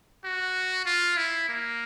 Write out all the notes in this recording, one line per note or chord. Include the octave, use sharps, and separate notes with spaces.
F#4
F4
E4
A#3